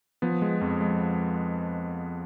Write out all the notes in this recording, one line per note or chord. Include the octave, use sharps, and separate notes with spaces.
F3 B3
G#3
F2
G#3